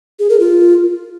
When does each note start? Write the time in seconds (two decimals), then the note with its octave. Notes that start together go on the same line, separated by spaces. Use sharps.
0.19 G#4
0.30 A#4
0.40 F4